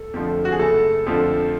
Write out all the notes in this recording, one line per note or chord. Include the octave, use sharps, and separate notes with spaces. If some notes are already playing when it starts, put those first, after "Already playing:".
Already playing: A4
F2 D3 F3 A3
F#4
G#4
F#1 A3 A4
F2 D3 F3 A3